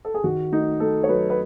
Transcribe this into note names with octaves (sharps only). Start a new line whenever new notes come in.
A4
G#4
D#3 F#4
A3 D#4
A3 A4
C#5
F#3 B4
B4